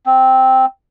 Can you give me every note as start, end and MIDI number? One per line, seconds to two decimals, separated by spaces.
0.06 0.66 60